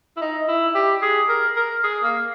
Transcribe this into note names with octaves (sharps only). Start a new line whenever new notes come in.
E4
D#4
E4
G4
G#4
A#4
A#4
G#4
A#3